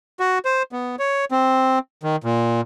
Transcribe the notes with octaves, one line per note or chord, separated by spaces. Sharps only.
F#4
C5
B3
C#5
C4
D#3
A#2